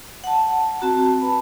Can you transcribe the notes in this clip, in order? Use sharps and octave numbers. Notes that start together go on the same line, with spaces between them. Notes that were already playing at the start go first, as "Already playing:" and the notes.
F#5 A5
C4 F#4 A5 A#5
B4 A5 B5